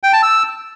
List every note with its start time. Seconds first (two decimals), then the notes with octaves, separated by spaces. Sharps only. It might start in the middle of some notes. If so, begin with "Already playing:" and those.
0.03 G5
0.13 A5
0.23 E6